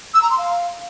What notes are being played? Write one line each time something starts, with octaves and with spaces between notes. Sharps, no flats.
E6
A#5
C6
F5